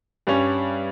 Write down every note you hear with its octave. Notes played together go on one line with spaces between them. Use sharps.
G2 G3 C#4